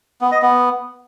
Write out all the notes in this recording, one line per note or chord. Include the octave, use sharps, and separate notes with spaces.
B3
D#5
B3